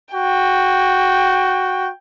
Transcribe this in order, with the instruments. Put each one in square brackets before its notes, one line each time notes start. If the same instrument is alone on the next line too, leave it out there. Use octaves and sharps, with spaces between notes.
[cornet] F#4 [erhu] G5